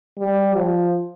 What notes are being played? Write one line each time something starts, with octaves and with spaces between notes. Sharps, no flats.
G3
F3